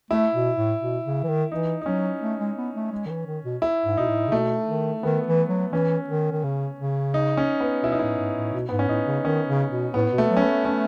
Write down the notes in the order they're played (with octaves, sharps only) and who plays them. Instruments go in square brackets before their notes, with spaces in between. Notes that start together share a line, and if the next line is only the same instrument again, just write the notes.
[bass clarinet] A3 [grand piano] E4
[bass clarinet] B2
A2
B2
C#3
E3
D#3
[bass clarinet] E3 [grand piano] D#4
[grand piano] D#4
[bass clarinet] F#3 [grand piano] C#4
[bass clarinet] A3
G#3
B3
A3
G#3
D#3
E3
D#3
B2
[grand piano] E4
[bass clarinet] G#2
[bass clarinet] B2 [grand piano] D#4
[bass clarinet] A2
C#3
[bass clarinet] B2 [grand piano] A3
[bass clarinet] D#3
[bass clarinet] D#3 [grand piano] B3
[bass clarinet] E3
F#3
[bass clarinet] E3 [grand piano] C#4
[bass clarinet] D#3
D#3
C#3
C#3
[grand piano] D#4
C#4
B3
[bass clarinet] B2 [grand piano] E4
[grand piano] D#4
[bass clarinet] A2 [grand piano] E4
[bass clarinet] G#2
A2
B2
[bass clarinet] G#2 [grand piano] B3
[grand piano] C#4
[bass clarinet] A2 [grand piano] D#4
[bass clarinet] C#3
[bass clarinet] D#3 [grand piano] C#4
[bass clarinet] C#3
B2
[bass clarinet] A2 [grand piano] B3
[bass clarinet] B2
[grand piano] A3
[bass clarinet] F#3
[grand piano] C#4
B3
[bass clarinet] A3
[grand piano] C#4